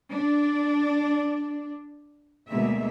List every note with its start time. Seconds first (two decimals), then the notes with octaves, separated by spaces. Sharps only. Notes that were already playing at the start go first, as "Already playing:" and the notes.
0.11 D4
2.49 D2 B2 G#3 A#3 E5